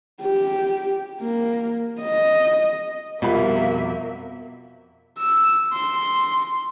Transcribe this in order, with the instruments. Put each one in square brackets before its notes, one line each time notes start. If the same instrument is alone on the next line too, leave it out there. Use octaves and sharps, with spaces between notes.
[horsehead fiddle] G4
A#3
D#5
[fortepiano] C2 F3 B5 [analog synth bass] F2 [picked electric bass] B2 [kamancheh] A#3 E5
[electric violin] E6
C6